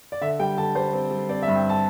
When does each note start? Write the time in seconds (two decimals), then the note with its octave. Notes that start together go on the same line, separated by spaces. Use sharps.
0.12 D5
0.21 D3 E5
0.39 G3 G5
0.57 D3 A5
0.75 G3 C5
0.93 C4
1.11 G3
1.29 C4 D5
1.42 E5
1.48 G2
1.56 G5
1.69 A5